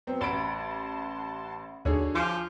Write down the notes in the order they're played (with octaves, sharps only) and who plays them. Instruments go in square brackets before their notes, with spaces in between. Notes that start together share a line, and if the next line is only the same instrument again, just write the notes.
[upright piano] F#3 B3 C4
[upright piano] A1 B5 D7 [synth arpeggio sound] F#5 A5 C6
[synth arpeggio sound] D#2 C#5 [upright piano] D3 F#4 G#4
[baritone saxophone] F3 [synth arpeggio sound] G#5 D6 [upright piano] C6